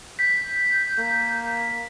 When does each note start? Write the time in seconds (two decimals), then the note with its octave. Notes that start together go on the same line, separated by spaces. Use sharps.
0.19 G6 B6
0.98 A#3